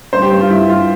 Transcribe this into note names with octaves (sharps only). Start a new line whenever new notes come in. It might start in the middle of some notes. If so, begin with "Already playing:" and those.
G2 C5
G4
G2
F4
G2 E4
G2 F4